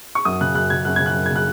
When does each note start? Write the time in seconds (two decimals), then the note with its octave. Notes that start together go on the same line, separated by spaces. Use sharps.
0.15 C#6
0.25 F#2 D#6
0.41 C#3 F#6
0.55 F#2 F#6
0.70 C#3 G#6
0.85 F#2 F#6
0.96 G#6
1.00 C#3
1.06 F#6
1.15 F#2
1.26 G#6
1.31 C#3
1.36 F#6